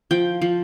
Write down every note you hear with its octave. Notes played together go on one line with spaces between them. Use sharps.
F3 G5
F3